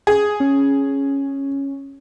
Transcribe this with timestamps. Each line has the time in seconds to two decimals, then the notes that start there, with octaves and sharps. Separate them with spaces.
0.07 G#4
0.40 C#4